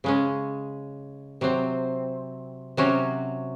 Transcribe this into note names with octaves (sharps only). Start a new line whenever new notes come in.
C#3 G#3 C#4
C3 F#3 C4
C3 F#3 C#4 F#4